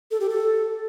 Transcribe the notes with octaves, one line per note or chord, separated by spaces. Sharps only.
A4
G4
A4